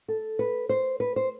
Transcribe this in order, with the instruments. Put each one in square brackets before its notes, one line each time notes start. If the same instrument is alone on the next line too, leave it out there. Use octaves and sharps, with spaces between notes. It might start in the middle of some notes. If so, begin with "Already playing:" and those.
[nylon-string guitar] A4
B4
C5
B4
C5